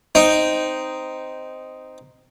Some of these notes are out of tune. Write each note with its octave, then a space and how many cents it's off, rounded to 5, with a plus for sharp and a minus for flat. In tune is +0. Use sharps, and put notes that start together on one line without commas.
C4 -10 D#4 +0